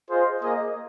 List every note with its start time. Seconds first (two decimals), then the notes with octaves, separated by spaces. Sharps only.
0.09 F4 G#4 C5 D#5
0.42 A#3 G#4 D#5